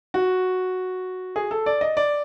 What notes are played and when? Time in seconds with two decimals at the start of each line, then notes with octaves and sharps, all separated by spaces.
0.14 F#4
1.36 G#4
1.51 A4
1.66 D5
1.81 D#5
1.97 D5